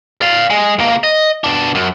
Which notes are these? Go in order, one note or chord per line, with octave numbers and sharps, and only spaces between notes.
D5 F5
G#3
C#2 A#3
D#5
B2 D4
F#2